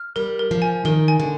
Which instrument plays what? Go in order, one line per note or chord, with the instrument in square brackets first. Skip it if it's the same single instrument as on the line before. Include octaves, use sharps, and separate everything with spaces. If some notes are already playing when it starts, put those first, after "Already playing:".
Already playing: [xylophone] F6
[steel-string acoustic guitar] G3 [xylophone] A#4
[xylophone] A#4
[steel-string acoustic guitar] F3
[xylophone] G#5
[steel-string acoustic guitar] D#3 [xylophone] A#4
[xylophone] G#5
[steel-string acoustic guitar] D3